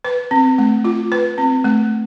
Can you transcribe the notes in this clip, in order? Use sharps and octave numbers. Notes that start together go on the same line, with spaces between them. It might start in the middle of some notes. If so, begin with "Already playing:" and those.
B4
C4
A3
F4
B4
C4
A3